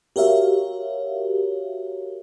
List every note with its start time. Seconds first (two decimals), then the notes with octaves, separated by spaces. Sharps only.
0.16 F#4 G4 A#4 C#5 E5 F5